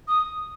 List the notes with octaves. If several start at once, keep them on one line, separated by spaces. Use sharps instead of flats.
D#6